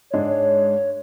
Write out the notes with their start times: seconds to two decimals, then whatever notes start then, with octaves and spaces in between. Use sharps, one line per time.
0.10 G#2 G#3 D4 C#5
0.28 C#5